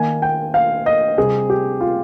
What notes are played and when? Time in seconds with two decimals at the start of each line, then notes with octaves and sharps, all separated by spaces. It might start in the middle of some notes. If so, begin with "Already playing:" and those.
Already playing: D#3 A#3 G#5
0.22 G5
0.54 F5
0.86 D#5
1.18 C3 G3 C4 G#4
1.50 G4
1.81 F4